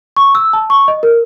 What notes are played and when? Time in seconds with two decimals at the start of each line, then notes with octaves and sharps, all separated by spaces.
0.17 C#6
0.35 E6
0.53 A5
0.70 C#6
0.88 D#5
1.03 A#4